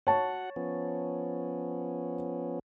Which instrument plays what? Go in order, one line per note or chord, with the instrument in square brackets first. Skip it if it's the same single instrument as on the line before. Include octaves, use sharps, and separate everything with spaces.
[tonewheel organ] F#4 F#5 [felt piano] C#5 A5
[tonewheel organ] F3 B3 C#4